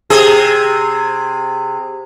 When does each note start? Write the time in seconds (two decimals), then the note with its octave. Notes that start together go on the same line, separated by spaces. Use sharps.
0.10 C3 G#4